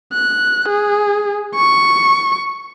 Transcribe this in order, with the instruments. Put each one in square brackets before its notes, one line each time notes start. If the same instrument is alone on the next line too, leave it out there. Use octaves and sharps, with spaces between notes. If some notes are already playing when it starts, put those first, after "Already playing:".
[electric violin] F#6
G#4
C#6